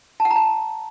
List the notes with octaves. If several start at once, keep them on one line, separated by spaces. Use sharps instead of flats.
A5
F#5
A#5
A5